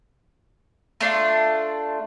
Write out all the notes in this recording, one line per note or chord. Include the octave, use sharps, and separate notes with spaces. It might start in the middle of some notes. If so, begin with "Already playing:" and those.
A3 D4 F4